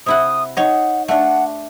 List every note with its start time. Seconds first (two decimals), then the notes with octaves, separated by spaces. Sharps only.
0.06 C3 E4 F#5 D#6
0.57 D#4 C#5 D#5 F#5
1.08 A3 D4 F#5